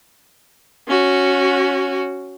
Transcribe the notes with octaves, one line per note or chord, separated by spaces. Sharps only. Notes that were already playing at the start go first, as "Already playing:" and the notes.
C#4 F#4